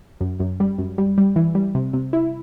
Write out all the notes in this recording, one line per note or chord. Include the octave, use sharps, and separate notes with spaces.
F#2
F#2
G3
F#2
G3
G3
E3
G3
C3
C3
E4